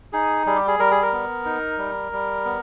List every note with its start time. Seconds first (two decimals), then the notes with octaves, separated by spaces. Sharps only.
0.13 D#4 G#4
0.46 G3 G#4
0.56 G4
0.67 G#4
0.79 G3 A#4
0.91 G#4
1.02 A#4
1.13 B3
1.45 D#4
1.78 G3
2.12 G3
2.45 B3